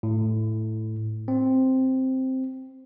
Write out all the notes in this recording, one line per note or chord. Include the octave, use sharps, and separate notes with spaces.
A2
C4